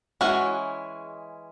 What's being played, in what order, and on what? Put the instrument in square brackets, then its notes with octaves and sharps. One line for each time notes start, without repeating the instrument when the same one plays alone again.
[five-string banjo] E3 G#3 C#4 F#4